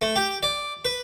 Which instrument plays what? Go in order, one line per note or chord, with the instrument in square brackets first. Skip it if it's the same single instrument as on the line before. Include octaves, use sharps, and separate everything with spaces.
[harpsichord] A3
G4
D5
B4